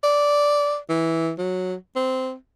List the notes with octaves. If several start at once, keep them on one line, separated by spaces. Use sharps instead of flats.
D5
E3
F#3
C4